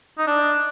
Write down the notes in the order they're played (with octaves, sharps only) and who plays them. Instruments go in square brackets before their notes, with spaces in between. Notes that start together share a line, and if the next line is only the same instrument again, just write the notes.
[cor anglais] D#4
D4